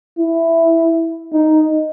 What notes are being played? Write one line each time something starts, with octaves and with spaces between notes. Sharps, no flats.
E4
D#4